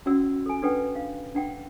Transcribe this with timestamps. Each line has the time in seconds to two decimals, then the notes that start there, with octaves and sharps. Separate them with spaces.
0.06 C#4 F#4 D5 F#5 E6
0.46 A4 G#5
0.62 D4 A4 B4 F#5 G5
0.95 F5
1.35 D4 F#5 G5